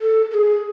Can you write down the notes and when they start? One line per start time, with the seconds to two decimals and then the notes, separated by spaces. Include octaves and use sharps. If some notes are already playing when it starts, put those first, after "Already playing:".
0.01 A4
0.31 A4
0.34 G#4